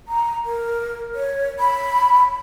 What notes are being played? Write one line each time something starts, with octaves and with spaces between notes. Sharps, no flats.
A#5
A#4
C#5
B5